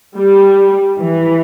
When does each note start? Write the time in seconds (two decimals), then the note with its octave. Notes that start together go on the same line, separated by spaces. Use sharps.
0.16 G3
1.00 E3